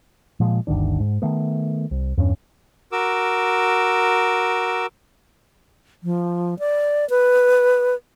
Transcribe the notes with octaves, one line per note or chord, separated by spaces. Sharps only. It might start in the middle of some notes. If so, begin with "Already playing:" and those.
A#2 F3 G#3
G1 D2 D#3 D4
G#2
D#3 A3 B3
C2
E2 G2 C#4
F#4 A#4 D6 E6
F3
D5
B4